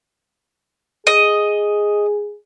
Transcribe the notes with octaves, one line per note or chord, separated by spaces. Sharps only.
G#4 D#5